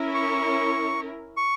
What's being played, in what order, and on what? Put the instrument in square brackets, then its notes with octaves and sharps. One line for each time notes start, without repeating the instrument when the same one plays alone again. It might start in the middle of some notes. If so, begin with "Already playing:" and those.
Already playing: [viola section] C#4 E4 A#4
[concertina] C#6
C#6